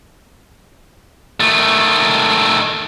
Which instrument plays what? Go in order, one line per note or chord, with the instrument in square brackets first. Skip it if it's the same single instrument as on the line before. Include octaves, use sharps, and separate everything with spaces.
[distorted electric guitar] D#3 A3